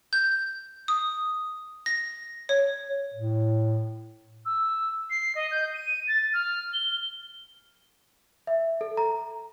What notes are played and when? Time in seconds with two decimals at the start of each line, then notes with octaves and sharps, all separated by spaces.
0.13 G6
0.88 D#6
1.86 A#6
2.49 C#5
3.14 A2
4.46 E6
5.10 C7
5.35 D#5
5.51 G6
5.74 D#7
6.08 A6
6.34 F6
6.74 G7
8.47 E5
8.81 A4
8.97 A#5